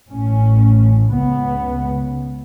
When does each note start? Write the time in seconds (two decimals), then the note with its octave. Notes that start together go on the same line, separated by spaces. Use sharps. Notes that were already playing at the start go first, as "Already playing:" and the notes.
0.10 A1 A2 C#4
1.13 C#2 C#3 B3